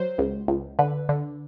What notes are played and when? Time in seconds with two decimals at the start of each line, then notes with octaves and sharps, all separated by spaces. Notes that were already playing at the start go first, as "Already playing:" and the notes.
Already playing: F#3 C5
0.18 C#2
0.48 C#2
0.79 D3 B4
1.09 D3